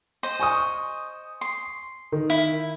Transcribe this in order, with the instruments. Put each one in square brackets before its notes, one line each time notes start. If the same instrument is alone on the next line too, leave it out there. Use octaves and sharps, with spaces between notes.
[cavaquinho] C5 D#5
[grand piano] G#5 C#6 D#6
[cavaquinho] C6
[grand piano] D#3
[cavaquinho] E4